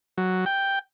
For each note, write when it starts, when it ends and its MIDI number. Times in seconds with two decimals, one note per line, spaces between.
0.18 0.45 54
0.46 0.79 79